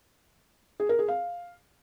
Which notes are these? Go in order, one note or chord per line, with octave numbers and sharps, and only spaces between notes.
G#4
A#4
G#4
F5